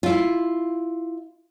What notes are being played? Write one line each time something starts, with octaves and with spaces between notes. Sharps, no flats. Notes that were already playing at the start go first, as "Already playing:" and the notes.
E4 F4